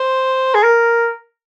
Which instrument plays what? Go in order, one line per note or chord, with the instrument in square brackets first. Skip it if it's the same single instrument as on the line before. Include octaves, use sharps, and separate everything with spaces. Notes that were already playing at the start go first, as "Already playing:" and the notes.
Already playing: [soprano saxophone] C5
G#4
A#4